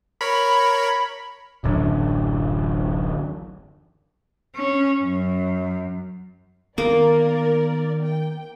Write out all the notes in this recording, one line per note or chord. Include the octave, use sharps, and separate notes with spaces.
A#4 C#5 B5
D1 A1 F#2 D3
C#4
F#2
D#3 A#3 B3 A#4 D5
G5